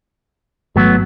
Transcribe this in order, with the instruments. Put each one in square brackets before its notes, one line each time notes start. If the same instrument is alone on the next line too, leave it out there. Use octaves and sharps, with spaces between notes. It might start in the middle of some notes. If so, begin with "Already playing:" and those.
[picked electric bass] G#1 A3 [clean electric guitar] F#3 B3